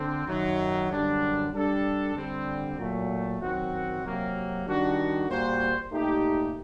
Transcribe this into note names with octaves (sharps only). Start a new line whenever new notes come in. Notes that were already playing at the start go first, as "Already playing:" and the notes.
Already playing: D3 C4
F#2 D#3 F#3
F#2 D3 G3 D4
G3 D4 A4
D3 G3 C4
A#2 F#3 A3
F#2 D#3 F#3 C4 F#4
C3 F#3 A#3
D#3 G3 D4 F#4
A#2 G3 A#3 F#4 C5
A#2 A3 D#4 G4